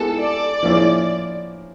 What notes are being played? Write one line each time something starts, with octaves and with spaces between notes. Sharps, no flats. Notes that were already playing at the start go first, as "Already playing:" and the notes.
Already playing: G#3 B3 E4 G4 A4
D5
F3 A#3 C#4 E4 G#4